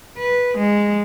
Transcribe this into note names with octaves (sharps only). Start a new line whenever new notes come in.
B4
G#3